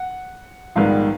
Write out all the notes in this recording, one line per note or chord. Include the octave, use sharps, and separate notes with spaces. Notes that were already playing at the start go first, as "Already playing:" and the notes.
Already playing: F#5
A#1 G#2 D#3 G3 B3 F5